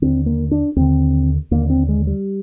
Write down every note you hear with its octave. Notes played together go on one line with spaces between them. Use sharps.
D#2 D3 C4
A#3
D4
D#2 D3 C4
D#2 D3 A#3
C4
G#3
G3